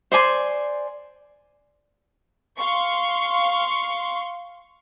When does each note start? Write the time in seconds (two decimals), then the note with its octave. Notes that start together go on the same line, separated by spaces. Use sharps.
0.12 C5 D5 G#5 C6
2.57 F5 C6 C#6